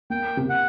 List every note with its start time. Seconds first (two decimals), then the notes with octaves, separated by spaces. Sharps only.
0.10 A#3 G5
0.37 C3
0.49 F#5